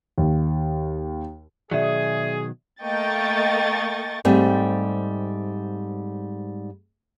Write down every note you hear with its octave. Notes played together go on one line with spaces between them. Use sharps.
D#2
B2 D#3 F#3 G#4 D5 E5
A3 A#3 D#5 G5 C#6 A6
G#2 G3 A3 C4